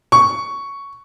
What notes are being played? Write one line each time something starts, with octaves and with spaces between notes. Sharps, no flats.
C#6